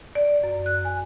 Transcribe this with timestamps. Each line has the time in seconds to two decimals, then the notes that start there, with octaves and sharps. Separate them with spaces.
0.15 D5
0.43 F#2
0.66 F#6
0.85 G#5